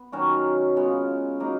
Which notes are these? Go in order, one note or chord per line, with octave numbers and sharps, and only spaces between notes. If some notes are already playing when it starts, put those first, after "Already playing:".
Already playing: B3
D#3 F#3 C#4 F#4
C#3 G#3 B3 F4
F#3 A#3 D#4